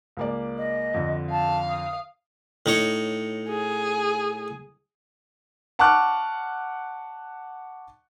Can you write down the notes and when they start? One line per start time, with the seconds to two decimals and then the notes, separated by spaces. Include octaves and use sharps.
0.17 C#2 A#3 D5
0.58 D#5
0.94 F2 D3
1.31 F5 A5
1.69 D#6
2.66 A2 D#4 C#5
3.49 G#4
5.79 F#5 A5 C#6 D6 F6 F#6